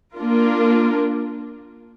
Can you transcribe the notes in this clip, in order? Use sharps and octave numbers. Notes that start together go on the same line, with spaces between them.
A#3 D4 F4 A#4